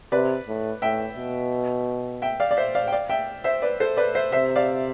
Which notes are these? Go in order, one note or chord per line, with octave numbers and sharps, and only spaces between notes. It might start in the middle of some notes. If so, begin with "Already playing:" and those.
C3 B4 D5
A2
A2 E5 G5
B2
E5 G5
D5 F5
D5
C5 E5
D5 F5
G5
D5 F5
E5 G5
C5 E5
B4 D5
A4 C5
B4 D5
C5 E5
C3 C5 E5
D5 F5